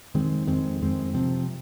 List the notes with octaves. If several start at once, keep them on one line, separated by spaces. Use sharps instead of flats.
F2 D#3 G#3 C4
F2 D#3 G#3 C4
F2 D#3 G#3 C4
C3 F3 C4